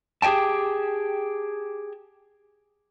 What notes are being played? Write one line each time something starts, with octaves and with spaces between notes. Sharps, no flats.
G4 G#4 E5 G5 A5